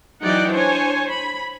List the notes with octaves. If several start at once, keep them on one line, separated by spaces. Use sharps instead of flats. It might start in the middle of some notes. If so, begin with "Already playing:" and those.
E3 F#3 D#4 D5 F#5 G5
D4 C5 C#5 G#5
B5